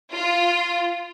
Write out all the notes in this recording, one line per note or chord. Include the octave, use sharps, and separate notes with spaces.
F4